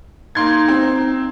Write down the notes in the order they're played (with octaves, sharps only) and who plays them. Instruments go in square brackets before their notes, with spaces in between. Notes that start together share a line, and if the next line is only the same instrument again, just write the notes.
[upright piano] A#3 C6 G#6 [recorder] D#4
[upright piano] C4